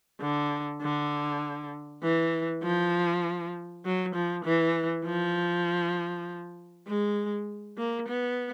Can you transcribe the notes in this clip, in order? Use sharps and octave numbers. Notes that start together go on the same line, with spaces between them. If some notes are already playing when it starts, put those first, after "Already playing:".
D3
D3
E3
F3
F#3
F3
E3
F3
G#3
A#3
B3